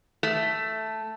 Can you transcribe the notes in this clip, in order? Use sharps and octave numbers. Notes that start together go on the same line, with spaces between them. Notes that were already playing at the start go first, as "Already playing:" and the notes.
A3